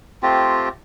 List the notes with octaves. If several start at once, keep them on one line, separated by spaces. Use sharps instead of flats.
A3 C4 F4 G4